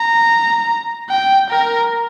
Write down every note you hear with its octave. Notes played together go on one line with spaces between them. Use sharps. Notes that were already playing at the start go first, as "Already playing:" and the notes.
Already playing: A#5
G5
A#4